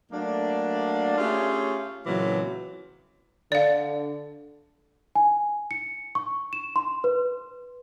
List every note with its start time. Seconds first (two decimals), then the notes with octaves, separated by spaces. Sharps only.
0.12 F#3 A3 A#3 D4
1.18 A3 C#4 F4 G4 G#4 C#5
2.06 A#2 C#3 E3 F#3 G#3 C4
3.52 D3 D5 F5
5.15 G#5
5.71 C#7
6.15 C#6
6.53 E7
6.76 C6
7.04 B4